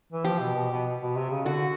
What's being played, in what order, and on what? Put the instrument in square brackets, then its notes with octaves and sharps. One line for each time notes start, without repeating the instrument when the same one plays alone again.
[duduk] E3
[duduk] F3 [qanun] G4
[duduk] B2
B2
B2
B2
C3
C#3
[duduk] D3 [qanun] F#4